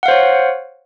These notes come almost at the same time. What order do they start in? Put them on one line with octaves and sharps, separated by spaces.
F#5 F5 C5 C#5